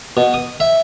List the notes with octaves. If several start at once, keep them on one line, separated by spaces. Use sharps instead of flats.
B2
D#6
E5